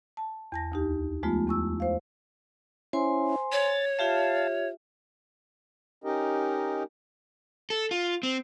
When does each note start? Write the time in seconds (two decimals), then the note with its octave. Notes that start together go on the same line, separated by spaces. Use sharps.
0.17 A5
0.52 E2 A5 A#6
0.72 D2 D#4 G4
1.23 F3 G#3 A3 B3 F4
1.48 E2 C#6 E6
1.80 C5 F5
2.93 C#4 E4 C5 G#5 C6
3.52 C#5 A6
3.99 F4 G4 E5 F5 A5
6.04 C#4 D#4 G4 A#4 D#5
7.70 A4
7.91 F4
8.23 C4